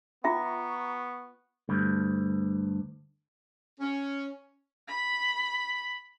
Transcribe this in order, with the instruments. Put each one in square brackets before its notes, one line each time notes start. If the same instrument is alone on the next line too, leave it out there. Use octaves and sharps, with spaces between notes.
[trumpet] B3 [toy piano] F4 E5 G5 [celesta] A#5 [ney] C#6
[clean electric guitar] D2 G2
[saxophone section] C#4
[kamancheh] B5